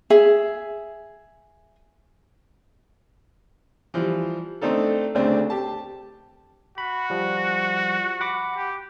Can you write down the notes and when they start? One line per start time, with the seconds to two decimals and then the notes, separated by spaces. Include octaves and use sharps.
0.10 G#4 E5
3.94 E3 F3 G3
4.62 A3 C4 D4 D#4 A4
5.15 D2 C#3 A3 C4 D4
5.50 G4 A5
6.78 F#4 B5
7.10 F3 G3
8.21 F#5 B5 D6
8.56 G4